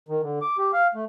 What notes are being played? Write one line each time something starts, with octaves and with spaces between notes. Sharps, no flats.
D#3
D3
D6
G4
F5
A3